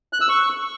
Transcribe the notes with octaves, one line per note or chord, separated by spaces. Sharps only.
F#6
E6
C#6